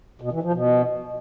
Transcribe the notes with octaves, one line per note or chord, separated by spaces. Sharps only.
B2
E3
F3
B2